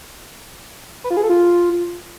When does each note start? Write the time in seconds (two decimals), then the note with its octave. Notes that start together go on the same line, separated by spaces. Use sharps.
1.04 B4
1.10 F4
1.17 G#4
1.23 A4
1.29 F4